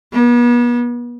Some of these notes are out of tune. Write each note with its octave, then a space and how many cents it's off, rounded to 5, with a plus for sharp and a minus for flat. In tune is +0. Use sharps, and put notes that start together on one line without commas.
B3 -40